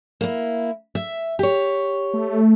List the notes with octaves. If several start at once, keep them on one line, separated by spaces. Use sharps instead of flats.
A#3 E4
E5
G4 C#5
A3